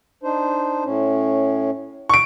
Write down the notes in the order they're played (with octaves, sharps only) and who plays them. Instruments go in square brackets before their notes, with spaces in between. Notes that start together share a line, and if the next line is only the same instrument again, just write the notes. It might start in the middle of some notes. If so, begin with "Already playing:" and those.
[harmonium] D4 D#4 C5
A2 C#4
[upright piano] C#6 D7